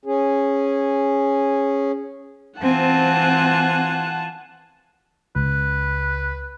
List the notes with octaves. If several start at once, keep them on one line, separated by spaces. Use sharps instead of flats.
C#4 G#4
E3 C4 F4 F#5 G#5 A5
C#2 B4